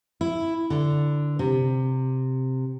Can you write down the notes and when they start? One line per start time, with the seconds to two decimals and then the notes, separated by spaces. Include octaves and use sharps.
0.21 E4
0.70 D3
1.39 C3